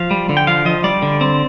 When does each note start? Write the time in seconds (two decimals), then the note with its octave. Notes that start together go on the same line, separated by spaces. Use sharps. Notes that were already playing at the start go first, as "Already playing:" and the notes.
Already playing: F3 F5
0.11 G3
0.29 D3
0.37 G5
0.47 F3 F5
0.65 F3 D#5
0.84 G3 D5
1.02 D3
1.21 C4